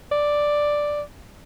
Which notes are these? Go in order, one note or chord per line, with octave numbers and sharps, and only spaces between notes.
D5